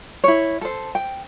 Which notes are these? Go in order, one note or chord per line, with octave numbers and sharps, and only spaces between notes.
E4 C#5
A4 C5
G5